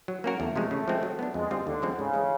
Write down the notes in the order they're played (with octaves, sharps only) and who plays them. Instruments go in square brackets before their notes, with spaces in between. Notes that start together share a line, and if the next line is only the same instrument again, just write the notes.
[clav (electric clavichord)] F#3
A#3 C#4 F#4 A#4
[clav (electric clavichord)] E2 [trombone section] A3
[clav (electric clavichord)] C3 F3 G#3
C#3
F3 G#3 C4
F#3
B3 D4
[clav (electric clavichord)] F2 [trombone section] G#3
[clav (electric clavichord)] D3 G3 C4 F4
[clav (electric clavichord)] D#2 [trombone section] D3
[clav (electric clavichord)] C#3 F3 G#3 C4
[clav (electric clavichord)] G#2 [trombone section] C#3
[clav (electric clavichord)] E3 G#3